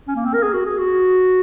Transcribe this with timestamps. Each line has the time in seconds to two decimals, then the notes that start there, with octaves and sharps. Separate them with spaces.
0.08 C#4
0.16 A#3
0.25 C4
0.34 A#4
0.43 G#4
0.53 F#4
0.65 G#4
0.78 F#4